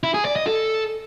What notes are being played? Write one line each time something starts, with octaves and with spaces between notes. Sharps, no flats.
E4
G#4
D5
D#5
A4